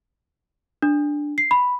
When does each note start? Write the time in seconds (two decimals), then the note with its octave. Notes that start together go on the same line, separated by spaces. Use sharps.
0.82 D4
1.38 C7
1.51 B5